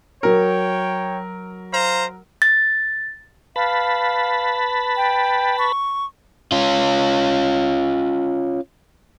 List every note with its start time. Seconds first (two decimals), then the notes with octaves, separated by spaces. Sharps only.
0.23 F#3 A#4 C#5 G5
1.72 C5 F5 A#5
2.42 A6
3.56 B4 F5 A5 B5
4.97 G5
5.59 C#6
6.52 C#4 F4